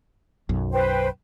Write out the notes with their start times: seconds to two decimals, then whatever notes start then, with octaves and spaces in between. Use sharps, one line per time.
0.49 B1 F#2
0.72 B4 C5 G5